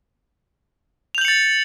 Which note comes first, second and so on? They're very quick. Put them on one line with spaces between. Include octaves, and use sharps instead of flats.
F7 G6 F#7 C#7 A6